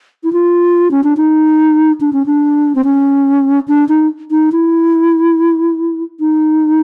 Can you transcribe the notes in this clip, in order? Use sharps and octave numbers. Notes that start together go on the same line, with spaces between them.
E4
F4
C#4
D4
D#4
D4
C#4
D4
C4
C#4
D4
D#4
D#4
E4
D#4